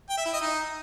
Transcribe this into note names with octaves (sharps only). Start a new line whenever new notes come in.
G5
E5
E4
D#5
D#4